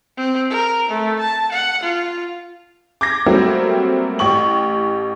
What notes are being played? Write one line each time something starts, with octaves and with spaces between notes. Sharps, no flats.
C4
A#4
A3
A5
F#5
F4
D6 G6 G#6 A#6
F#3 G3 A3 A#3 C4 F#4
A1 G4 C#6 F#7